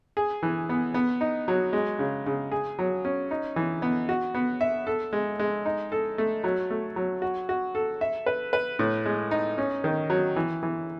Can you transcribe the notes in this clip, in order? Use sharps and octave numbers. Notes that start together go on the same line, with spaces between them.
G#4
E3
B3
B3
D#4
F#3
G#3
C#3
C#3
G#4
F#3
C#4
D#4
E3
B3
F#4
B3
E5
A4
G#3
G#3
D#4
A4
A3
F#3
A3
F#3
F#4
F#4
A4
E5
B4
B4
A2
G#3
D#4
C#4
D#3
F#3
E3
E3